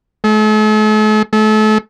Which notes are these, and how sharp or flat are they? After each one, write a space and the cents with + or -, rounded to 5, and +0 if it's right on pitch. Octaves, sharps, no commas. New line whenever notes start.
A3 -45
A3 -35